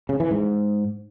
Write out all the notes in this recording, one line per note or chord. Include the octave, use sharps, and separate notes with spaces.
C#3
E3
G#2